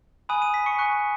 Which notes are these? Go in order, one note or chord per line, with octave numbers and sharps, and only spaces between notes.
G#5 B5 D#6 F#6 D#7
D#6 D#7
B6
C#6 C#7
G#5 C#6 F#6